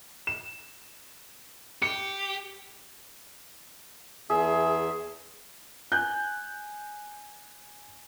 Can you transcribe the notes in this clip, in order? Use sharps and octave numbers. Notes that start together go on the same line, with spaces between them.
E7
G4 C#7
E2 G#4 E5
G#5 F#6 G6